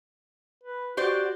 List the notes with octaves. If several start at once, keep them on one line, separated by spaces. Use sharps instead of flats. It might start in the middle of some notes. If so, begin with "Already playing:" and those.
B4
F#4 G4 C5 D5